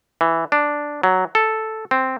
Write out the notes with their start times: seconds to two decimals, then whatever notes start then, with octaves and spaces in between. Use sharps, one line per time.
0.21 E3
0.52 D4
1.03 F#3
1.35 A4
1.91 C4